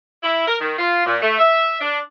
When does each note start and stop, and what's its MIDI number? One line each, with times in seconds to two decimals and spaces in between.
0.23 0.44 64
0.48 0.56 70
0.61 0.75 51
0.79 1.03 65
1.06 1.17 46
1.22 1.39 57
1.39 1.79 76
1.81 1.99 62